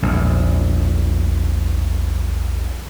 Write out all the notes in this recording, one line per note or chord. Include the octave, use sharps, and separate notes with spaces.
A#1 E2